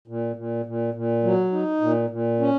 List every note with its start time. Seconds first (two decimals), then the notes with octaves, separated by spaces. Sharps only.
0.08 A#2
0.36 A#2
0.66 A#2
0.94 A#2
1.23 F#3
1.52 D#4
1.81 A#2
2.10 A#2
2.40 C#4